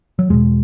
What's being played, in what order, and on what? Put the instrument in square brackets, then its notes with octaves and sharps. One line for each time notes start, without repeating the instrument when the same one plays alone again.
[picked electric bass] F#3
E2 B2 G#3